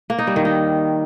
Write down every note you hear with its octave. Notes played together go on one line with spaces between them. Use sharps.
A#3
D#4
G3
D#3
D#4